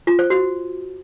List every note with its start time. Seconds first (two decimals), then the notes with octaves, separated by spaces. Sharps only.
0.07 F4
0.19 C5
0.30 F#4